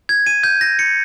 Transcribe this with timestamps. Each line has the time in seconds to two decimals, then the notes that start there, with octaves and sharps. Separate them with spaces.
0.09 G#6
0.27 D#7
0.43 G6
0.61 A#6
0.79 C#7